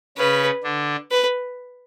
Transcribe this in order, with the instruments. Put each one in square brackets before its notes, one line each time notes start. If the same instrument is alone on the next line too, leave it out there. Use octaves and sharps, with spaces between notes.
[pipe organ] C#3 C#4 [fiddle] B4
[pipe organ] D3 D4
[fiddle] B4